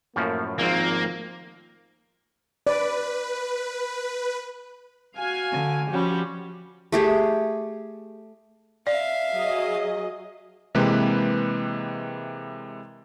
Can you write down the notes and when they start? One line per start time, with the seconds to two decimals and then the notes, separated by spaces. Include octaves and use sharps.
0.16 F#2 A2 F3 A#3
0.59 G#1 F3 A#3 C4
2.67 B4 D5
5.18 F#4 F5 G#5
5.50 D3
5.91 F3 G3 C#4 F#4 G4
6.92 A3 G4 G#4
8.87 D5 E5 F5
9.34 F#3 G#4 D#5
10.75 C3 E3 G#3 A#3 G4 B4